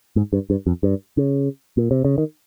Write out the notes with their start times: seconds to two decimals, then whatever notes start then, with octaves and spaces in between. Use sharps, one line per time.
0.16 G#2
0.33 G2
0.50 G2
0.67 F2
0.83 G2
1.17 C#3
1.77 A#2
1.91 C3
2.05 C#3
2.18 D#3